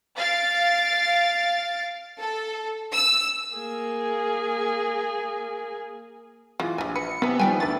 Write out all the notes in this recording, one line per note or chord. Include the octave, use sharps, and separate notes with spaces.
F5 A6 D7
A4
E6
A#3 G#4
E3 G#3 F4
A#1 G3 G#5
B4 C#7
C3 E3 B3 B4 G#5
D#3 F3 G3 B3 B4 G5 G#5
D2 D4 E4 B4 A6